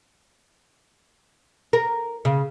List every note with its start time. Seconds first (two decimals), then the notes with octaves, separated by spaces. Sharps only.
1.73 A#4
2.25 C#3